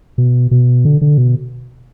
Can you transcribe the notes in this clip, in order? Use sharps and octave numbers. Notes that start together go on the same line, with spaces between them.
B2
B2
D3
D3
B2